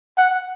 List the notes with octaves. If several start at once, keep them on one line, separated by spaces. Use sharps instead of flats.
F#5